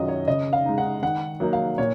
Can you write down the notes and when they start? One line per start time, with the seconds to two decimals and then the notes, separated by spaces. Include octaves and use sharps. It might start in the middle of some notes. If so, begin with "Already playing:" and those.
Already playing: F#2 D#3 F#3 C#4 F4 D#5
0.08 C#5
0.27 C#3 D#5
0.53 F5
0.66 G#3 D#4
0.78 F#5
1.02 D#3 F#5
1.40 F#3 A#3 D#4
1.53 F5
1.78 A#2 C#5